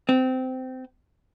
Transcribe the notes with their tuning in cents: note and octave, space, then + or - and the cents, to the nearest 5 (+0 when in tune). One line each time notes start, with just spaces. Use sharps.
C4 -20